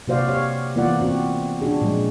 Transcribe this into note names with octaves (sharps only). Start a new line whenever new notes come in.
C3 A#3 F#4 C5 D5 F5
G4 C#5 F5
E3 A#3 B3 F4 D5 F#5
C4 F#4
C#4 D4 F#4 G#4
A#2 F3 G#3